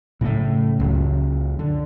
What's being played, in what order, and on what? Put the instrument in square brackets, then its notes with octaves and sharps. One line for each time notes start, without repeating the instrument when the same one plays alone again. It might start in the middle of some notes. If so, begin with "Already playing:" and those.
[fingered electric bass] A2 A3 [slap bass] C#3 F#3 C#4
[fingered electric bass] C#2 F#2
D3